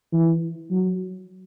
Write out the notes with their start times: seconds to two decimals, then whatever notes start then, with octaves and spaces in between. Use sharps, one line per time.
0.12 E3
0.71 F#3